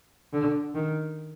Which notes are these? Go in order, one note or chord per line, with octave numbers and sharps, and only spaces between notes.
D3
D#3